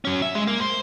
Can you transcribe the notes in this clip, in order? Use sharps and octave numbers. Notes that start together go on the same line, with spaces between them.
F#3 C#4
E5
G#3
A#3
C5